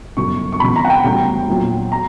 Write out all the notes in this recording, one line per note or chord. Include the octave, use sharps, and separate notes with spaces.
G1 F#2 C#3 F#3 C#6
C#6
E2 C#3 F#3 B5
A#5
F#5
G5
E1 D2 C#3 G3
A#1 A#2 F#3
A#5